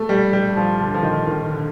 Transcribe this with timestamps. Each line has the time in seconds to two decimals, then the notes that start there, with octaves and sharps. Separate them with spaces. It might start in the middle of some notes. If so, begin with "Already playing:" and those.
Already playing: A3
0.09 G3
0.33 G3
0.56 F3
0.80 D3
0.94 F3
1.03 D#3
1.27 D#3
1.51 D3